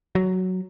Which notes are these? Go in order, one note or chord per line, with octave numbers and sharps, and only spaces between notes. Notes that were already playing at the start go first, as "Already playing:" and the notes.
F#3